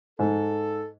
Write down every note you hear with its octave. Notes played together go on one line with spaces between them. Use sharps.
G#2 A4